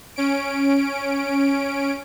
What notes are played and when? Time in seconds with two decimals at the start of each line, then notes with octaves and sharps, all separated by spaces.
0.16 C#4 D7